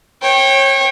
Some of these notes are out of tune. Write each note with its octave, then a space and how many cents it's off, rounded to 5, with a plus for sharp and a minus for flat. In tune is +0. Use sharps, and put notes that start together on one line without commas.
C#5 -30 G5 +0